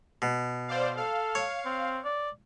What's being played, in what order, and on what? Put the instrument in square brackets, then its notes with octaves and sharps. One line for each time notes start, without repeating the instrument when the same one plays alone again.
[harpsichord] B2
[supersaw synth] C5 D5 F5
[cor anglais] A4 [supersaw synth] F5
[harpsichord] C#5
[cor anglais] C4
D5